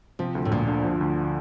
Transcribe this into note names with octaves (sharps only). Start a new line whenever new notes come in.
C3 F3
D2
A2
D2 A#2
D3
F3
D2